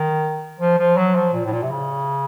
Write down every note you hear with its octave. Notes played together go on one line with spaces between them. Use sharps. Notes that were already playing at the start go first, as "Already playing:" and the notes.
Already playing: D#3
F3
F3
F#3
F3
A#2
A2
A#2
C3
C#3